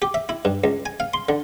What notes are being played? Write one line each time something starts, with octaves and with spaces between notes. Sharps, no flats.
G4
E5
E4
G2
C#2
G#5
F5
C6
D3